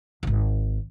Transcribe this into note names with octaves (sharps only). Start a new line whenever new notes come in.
D1 G#1